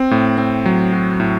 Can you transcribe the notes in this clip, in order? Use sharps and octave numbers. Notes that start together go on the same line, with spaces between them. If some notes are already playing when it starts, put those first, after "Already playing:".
Already playing: C4
A2
C4
F#3
F#4
A2